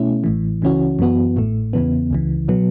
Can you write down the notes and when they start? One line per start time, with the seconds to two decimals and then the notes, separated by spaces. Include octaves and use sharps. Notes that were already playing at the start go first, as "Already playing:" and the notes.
Already playing: B2 A3 C#4 E4
0.24 A1 A2 E3
0.62 C#2 C#3 E3 C#4 F#4
0.99 F#2 E3 B3 F#4
1.36 A1 A2 A3
1.73 E2 C#3 E3 B3
2.11 C#2 C#3 E3
2.48 B2 F#3 B3